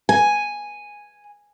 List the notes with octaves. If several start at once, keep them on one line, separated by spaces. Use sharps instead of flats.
G#5